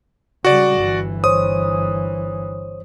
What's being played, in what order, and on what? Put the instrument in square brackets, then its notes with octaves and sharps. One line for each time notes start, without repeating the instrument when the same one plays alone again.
[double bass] C#3 G3 [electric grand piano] F#4 D5
[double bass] G1 E3
[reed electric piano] C5 C#5 [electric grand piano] D#6